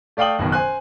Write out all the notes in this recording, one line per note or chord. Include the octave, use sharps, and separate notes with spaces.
A3 D5 F5 G5 D#6 F#7
F#1 F#2 B2 D#3
C5 G#5 F#6